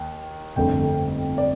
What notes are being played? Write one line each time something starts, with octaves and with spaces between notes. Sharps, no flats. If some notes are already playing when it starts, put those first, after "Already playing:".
Already playing: D#2
G1 F2 D3 A3 G5
D5